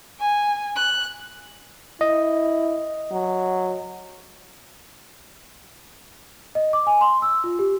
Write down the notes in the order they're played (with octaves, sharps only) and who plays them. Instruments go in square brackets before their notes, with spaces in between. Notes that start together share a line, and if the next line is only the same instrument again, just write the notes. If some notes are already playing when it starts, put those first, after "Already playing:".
[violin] G#5
F#6
[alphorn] E4 [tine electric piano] D#5
[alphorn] F#3
[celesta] D#5
D6
G#5
C6
E6
F4
G4